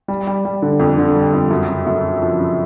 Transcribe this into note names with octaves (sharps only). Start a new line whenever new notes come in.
G3
G3
G3
D3
F2
D3
G3
F2
F#2
C#3
F#2
C#3
F3
C#3